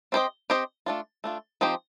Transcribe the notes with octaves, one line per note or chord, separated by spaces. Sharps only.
C4 G4 C5 D#5
C4 G4 C5 D#5
A3 D4 F4
A3 D4 F4
F3 C4 D#4 G4 C5